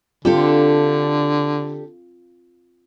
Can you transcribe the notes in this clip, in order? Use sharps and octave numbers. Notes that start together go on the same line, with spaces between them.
D3 C4 D4 F4 G4 A4